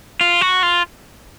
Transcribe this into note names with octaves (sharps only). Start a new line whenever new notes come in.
F4
F#4
F4